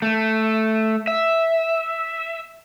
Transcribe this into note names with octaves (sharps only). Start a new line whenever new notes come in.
A3
E5